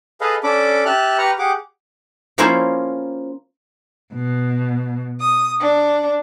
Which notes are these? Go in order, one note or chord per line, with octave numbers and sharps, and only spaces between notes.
G#4 A4 B4 D#5 F5
C#4 D4 A4 B5 D6
G4 E5 A5 F6 F#6
G4 B4 A#5 C#6 F6
G4 G#4 F#5 D6
F3 A#3 C#4 E4 A#4 C5
B2
D#6
D4